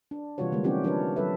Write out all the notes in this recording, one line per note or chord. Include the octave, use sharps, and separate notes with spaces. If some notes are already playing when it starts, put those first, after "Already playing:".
D4
C3 E3 G3 F4 F#4 C#5
D3 G3 G#3 A#3
F3 C4 C#4 D#4 F#4 G4
F3 D4 D#4 A#4 B4 C#5
F#3 G3 A4 B4 E5